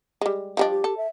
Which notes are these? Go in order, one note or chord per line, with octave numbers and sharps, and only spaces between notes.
G3 G#3
F3 G3 D4 D#5
G4
A4
E5